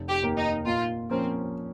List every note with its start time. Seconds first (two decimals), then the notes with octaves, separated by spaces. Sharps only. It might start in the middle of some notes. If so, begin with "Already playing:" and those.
Already playing: F1
0.09 G4
0.22 D#2 D#3 A#3
0.37 D#4
0.66 A#2 F4
1.10 F3 A#3 C4 C#4